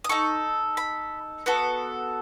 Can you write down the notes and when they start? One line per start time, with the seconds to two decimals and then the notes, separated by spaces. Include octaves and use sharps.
0.04 D#6
0.09 D#4 A4 C#6
0.77 B5
1.46 B3 F#4 A4